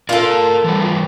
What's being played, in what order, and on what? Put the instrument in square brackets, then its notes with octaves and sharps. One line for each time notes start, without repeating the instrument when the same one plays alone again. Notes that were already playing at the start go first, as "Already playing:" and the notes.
[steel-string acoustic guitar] F4 A4 [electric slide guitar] A#4 D5
[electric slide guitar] E3 G3